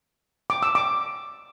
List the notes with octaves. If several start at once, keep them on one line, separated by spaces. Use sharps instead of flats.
D6
E6
D6